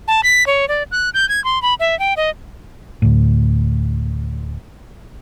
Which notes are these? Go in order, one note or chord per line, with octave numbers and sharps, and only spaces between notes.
A5
B6
C#5
D5
F#6
G6
G#6
C6
B5
E5
G5
D#5
D2 A2